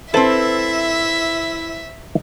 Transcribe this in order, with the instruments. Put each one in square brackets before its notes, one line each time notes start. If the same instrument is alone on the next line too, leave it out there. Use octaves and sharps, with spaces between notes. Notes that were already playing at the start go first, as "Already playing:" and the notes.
[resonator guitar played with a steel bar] C4 A4 [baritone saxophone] E4 [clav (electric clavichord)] B4 C5 A5 [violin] E5